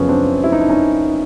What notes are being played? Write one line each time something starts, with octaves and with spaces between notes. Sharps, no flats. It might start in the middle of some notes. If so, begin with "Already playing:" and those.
Already playing: F#2 C#3 F3 B3 C#4
C4 D4
E4
D#4
D4
C#4 D#4